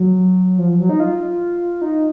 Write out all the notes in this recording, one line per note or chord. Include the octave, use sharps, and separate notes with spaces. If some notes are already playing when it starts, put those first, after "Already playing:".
Already playing: F#3
F3
F#3
D#4
F4
D#4